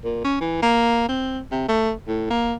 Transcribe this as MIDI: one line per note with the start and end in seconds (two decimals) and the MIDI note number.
0.04 0.20 46
0.24 0.36 61
0.41 0.60 52
0.62 1.07 58
1.09 1.39 60
1.51 1.65 48
1.69 1.92 57
2.08 2.25 45
2.30 2.54 58